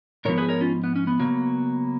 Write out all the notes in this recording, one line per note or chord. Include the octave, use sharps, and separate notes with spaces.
G#2 F3 B3 A#4 C#5
G#4 B4
A#4 C#5
C#4 F4
B3
C#4
B3
C#3 F#3 A#3